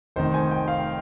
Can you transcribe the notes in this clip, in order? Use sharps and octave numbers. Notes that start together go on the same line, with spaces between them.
F1 F2 D#3 C5
G#5
G5
F5